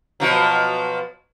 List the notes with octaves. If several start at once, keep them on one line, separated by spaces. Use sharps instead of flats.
B2 F3 F#3